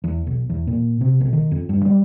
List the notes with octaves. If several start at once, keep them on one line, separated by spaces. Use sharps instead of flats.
E2
B1
E2
A#2
C3
B1
D#3
F2
G2
G3